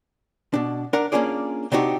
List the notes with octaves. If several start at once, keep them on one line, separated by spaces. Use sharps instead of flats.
B2 D4
D4 A#4 F#5
A#3 C#4 D4 F4 G#4 D5
C3 C4 D4 D#4 F#4 G4